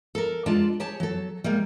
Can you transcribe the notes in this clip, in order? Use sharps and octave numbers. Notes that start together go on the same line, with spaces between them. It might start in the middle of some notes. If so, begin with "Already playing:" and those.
A4 A#4
G#3 D4 F4 D5 A5
G4 G#4 C#5 G#5 A5
F#3 A4
G3 G#3 A#3